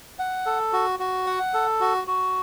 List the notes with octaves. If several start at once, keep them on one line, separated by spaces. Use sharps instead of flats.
F#5
A4
F#4
F#4
F#5
A4
F#4
F#4